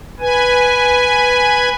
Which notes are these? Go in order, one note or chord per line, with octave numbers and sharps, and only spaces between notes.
B4 G#5